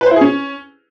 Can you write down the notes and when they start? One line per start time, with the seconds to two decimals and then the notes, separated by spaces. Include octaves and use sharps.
0.01 B4
0.06 C5
0.11 E4
0.16 G#4
0.21 C#4